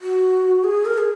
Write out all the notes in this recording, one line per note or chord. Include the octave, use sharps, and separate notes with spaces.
F#4
G#4
A#4
G#4